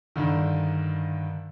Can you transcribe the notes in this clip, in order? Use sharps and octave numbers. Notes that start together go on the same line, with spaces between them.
G2 D3 D#3